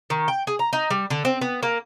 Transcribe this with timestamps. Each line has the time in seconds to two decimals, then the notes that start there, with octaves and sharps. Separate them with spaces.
0.10 D#3
0.28 G5
0.47 G#4
0.59 A#5
0.73 D#4
0.90 G3
1.10 D3
1.25 C4
1.41 B3
1.63 A#3